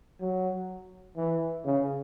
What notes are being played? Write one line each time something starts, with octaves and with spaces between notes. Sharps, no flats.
F#3
E3
C#3